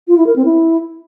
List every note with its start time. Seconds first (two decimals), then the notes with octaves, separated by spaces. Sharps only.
0.08 F4
0.17 E4
0.26 A#4
0.36 C4
0.45 E4